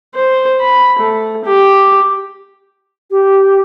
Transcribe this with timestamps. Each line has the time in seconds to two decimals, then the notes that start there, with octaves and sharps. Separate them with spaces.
0.15 C5
0.61 B5
0.99 A3
1.45 G4
3.10 G4